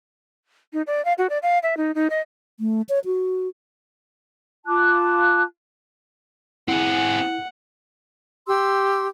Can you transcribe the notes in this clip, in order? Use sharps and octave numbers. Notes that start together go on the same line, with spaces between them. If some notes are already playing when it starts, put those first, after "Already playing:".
D#4
D5
F5
F#4
D5
F5
E5
D#4
D#4
D#5
A3
C#5
F#4
F4 A5 D6 F#6
C4 E4 G#4 F#5
G4 C6 E6